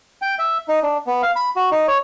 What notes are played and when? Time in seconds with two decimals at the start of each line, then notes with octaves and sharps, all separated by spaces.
0.22 G5
0.39 E5
0.68 D#4
0.82 D4
1.07 B3
1.23 F5
1.36 B5
1.56 F#4
1.72 D#4
1.88 C#5